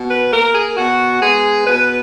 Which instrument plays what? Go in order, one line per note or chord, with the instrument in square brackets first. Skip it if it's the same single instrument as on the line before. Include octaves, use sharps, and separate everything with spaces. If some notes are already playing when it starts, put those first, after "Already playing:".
Already playing: [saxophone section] B2
B4
A#3 A#4
G#4
B2 F#4
G#3 B3 G#4
B2 B4